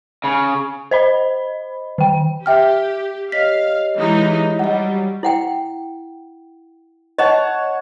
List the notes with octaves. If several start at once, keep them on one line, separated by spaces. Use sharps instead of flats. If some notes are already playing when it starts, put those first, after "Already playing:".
C#3
C5 D#5 B5
D#3 G5
G4 E5 G5 F6
G4 C#5 D#5 F5 B6
E3 G#3 D#4
F#3 G3 D#5 F#5
E4 F#5 G5
C#5 D#5 F#5 A5